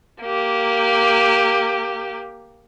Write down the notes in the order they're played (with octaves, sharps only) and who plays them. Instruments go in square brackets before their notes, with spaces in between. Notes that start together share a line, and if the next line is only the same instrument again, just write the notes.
[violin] A#3 G4